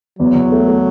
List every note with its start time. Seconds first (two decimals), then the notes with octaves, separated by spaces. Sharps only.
0.19 E2 F#3
0.35 E2
0.52 A3
0.68 A3